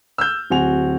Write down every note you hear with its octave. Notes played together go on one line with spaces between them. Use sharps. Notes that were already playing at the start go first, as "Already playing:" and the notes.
E6 F6 G6
D1 C4 F#4 G#5 F7